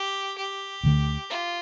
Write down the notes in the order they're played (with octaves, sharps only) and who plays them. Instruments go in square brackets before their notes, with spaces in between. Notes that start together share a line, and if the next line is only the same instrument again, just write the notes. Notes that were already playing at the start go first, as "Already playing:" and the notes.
Already playing: [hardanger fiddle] G4
G4
[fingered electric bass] D2 D3 A3
[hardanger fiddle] F4